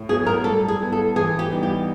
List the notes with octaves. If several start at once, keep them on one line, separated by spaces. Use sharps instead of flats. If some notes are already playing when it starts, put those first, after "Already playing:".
Already playing: A2
F#3 B3 G#4
A#4
G3 A4
G#4
B3 E4
A4
E3 G#4
G4
G3 B3 D#4
G4